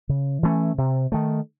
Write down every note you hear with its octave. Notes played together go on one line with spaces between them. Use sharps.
C#3
E3 A3 C#4
C3
D#3 A3